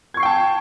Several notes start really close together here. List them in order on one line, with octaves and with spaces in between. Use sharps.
G#6 C#6 C7 G5 A5